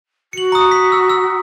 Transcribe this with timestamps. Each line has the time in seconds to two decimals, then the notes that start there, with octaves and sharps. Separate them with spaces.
0.33 F#4 C#7 F#7
0.52 A#5 D#6
0.72 B6
0.92 E6
1.10 E6